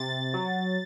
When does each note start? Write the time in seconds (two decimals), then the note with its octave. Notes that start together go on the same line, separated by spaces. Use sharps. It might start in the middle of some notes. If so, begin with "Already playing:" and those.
Already playing: C3 A6
0.34 F#3